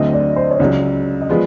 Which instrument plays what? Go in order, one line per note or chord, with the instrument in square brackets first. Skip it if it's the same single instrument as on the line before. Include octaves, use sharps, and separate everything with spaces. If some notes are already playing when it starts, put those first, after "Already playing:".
Already playing: [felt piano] D2 D3 F#3 A3 C4 [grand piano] D#5
[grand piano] D5
C5
C#5
[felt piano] C#2 C#3 F#3 [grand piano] D5
[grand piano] D#5
[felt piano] F3 G#3 B3 [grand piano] D5